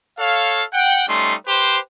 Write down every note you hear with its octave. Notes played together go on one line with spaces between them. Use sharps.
A4 C#5 F5
F#5 G5
G3 A3 C#4 D#4 C6
G4 B4 C5